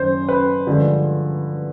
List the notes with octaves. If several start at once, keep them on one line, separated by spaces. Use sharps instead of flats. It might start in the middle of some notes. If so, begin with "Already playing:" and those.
Already playing: F#1 F#2 D#3 C5
B4
G2 D3 F3 G#3